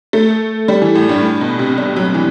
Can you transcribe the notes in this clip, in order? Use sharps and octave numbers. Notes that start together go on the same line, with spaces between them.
A3
G3
E3
A2
G2
G2
B2
C3
G3
F#3
E3